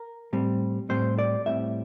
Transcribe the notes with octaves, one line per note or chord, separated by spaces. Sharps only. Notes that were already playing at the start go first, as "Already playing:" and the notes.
Already playing: A#4
A2 G3 C4
A2 G3 C4 C5
D5
A2 G3 C4 E5